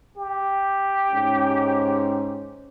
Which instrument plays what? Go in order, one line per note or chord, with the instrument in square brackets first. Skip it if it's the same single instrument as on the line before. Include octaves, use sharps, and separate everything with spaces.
[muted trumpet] G4
[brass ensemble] G#2 C#4